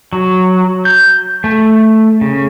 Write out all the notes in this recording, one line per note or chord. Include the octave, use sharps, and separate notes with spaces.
F#3
G6
A3
C#3